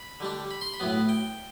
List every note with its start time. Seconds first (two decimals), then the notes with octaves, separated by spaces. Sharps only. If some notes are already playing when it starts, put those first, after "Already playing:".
Already playing: B5
0.20 D3 G3 D4
0.51 B5
0.61 C6
0.74 B5
0.80 A2 F#3 B3
1.09 G5